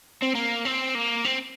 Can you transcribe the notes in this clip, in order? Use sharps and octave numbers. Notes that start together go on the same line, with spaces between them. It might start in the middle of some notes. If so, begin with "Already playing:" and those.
C4
A#3
C4
A#3
C4